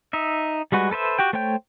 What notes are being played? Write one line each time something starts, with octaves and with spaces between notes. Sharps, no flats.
D#4 E5
G3 G#3 F#4 B4
A4 B4 C5 E5
F#4 G4 G5
A3 C5 C#5 G5 G6